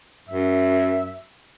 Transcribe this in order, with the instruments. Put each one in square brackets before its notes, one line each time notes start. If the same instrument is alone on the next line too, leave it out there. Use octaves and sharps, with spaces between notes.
[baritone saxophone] F#2 [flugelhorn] E5